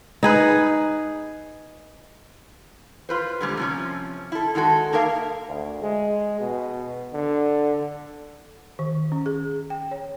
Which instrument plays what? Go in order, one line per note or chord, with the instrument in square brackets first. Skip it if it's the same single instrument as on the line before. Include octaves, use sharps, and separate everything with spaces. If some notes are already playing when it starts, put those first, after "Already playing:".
[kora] D#4 G#4 B4
[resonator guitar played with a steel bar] F4 B4 C5
D3 G3 G#3 A#3
C3 F3 C#4
E4 A4
D#3 G#3 F#4 A4
A#3 D#4 A#4 E5 F5
[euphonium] D2
G#3
B2
D3
[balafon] D#3
C#4
G#4
G5
C#5